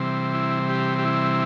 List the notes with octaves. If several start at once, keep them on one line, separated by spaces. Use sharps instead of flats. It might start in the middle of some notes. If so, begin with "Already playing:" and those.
Already playing: C3 E3 G3 C4
E4
G4
G4
E4